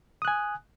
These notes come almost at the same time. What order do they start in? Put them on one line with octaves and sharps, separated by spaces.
D#6 F#6 G#5